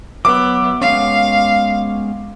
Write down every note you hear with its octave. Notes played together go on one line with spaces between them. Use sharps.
F#3 B3 E5 D6
G#3 B3 C#4 F5